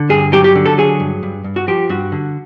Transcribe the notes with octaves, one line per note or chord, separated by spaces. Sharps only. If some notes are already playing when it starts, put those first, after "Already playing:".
Already playing: D3
G2 G#4
F#3 G4
G4
D3
A4
F#3 G#4
G2
G2
G2
F#4
F3 G4
G2 F#4
D3